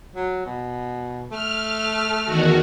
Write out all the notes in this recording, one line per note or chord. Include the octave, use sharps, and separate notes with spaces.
F#3
B2
A3 F6
E2 D#3 F#4